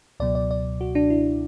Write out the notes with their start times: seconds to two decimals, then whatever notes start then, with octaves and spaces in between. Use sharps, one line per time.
0.20 C#2 B2 F#3 D5
0.35 D5
0.51 D5
0.81 F#4
0.95 D4
1.10 E4